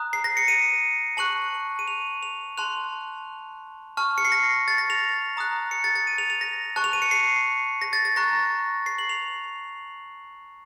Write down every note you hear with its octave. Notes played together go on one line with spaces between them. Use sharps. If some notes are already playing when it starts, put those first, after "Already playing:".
Already playing: A#5 D#6 F#6
C7
A#6
C#7
D#7
A5 C#6 F#6 F#7
D#7
F7
F7
A5 C6 F#6 F7
A5 C#6 F6
C#7
C7
A#6
A6
A#6
F7
A#5 D#6 F#6
C#7
A6
A6
D#7
F7
F7
A#6
A5 C#6 F#6
F7
D#7
C#7
C7
A#6
A6
A6
A#5 C#6 F#6 A#6
C7
F#7
F7